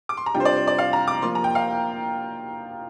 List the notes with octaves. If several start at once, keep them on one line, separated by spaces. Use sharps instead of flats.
D6
C6
A#5
C3 G3 D4 F4 G5
C5
D5
C5
D5
F5
A#5
D6
F3 A#3 F4 C6
A#5
G5
F5